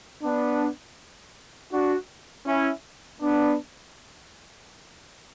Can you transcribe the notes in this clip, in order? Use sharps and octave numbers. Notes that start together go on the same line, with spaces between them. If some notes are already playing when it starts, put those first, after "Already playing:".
B3 D4
D4 F#4
C#4 E4
B3 D4